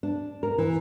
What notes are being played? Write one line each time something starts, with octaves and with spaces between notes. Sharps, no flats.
D4
A#4
E3